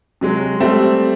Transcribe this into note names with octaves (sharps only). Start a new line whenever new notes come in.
C3 F#3 G#3
G3 A3 C4 E5